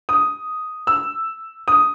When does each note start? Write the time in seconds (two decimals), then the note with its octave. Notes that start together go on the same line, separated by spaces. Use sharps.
0.09 D#6
0.87 E6
1.68 D#6